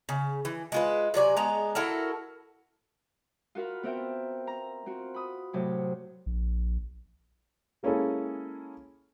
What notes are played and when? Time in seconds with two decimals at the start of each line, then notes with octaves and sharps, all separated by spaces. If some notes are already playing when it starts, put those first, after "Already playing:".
0.09 C#3
0.45 E3
0.72 G#3 F4 B4
1.14 C3 F#3 D5 G#5
1.37 G#3 B3 D4 A#5
1.75 E4 F#4 A4 A#4
3.55 F4 F#4 A#4 F5 B5
3.83 B3 C4 A#4 E5 G5
4.47 A#5
4.86 C4 F4 F#4
5.14 B5 D#6
5.53 A2 C3 F#3
6.26 A#1
7.83 G#3 A#3 C#4 E4 G#4 A4